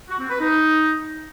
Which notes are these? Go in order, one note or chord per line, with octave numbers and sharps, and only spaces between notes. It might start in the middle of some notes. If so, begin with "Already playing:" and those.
F#4
C4
B4
D#4